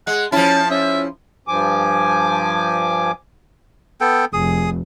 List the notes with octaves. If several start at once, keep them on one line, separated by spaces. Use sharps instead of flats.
G#3 F#5
F3 C#4 E4 A5
C#4 E5
G2 F3 G#5 D6
B3 A4 G5
F1 G#4 D#6